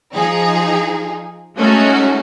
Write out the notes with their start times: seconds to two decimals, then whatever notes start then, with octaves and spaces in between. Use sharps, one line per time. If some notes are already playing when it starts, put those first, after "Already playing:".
0.14 F3 D#4 G#4
1.56 G#3 A3 C#4 D#4 F#4